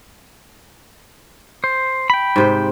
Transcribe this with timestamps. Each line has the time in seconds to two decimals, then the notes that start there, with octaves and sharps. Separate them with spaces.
1.64 C5
2.10 G5 B5
2.36 G#2 C3 C5